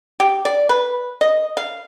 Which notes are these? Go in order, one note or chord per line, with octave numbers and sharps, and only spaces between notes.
G4
D5
B4
D#5
F5